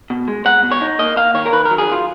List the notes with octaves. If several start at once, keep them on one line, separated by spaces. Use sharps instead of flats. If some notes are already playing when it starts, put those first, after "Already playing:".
B2
G#3
G#3 F#5
B2
C#5
D#4
A#3 D#5
A#3 F5
D#3 C#5
A#4
D#3 B4
A#4
F#3
G#4
F#3 F4